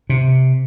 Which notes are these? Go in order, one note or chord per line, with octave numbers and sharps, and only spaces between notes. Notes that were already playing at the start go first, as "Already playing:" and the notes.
C3